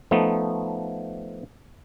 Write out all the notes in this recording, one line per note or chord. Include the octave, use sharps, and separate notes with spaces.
F3 A3 B3 D#4